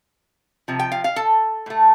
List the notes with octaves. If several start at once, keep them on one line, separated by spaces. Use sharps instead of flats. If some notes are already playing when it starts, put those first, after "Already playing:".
C3 F3
G5
F5
F5
A4
A2 A3